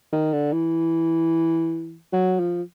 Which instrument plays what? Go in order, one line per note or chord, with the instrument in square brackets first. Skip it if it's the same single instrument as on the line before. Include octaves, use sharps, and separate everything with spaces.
[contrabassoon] D#3
D3
E3
F#3
F3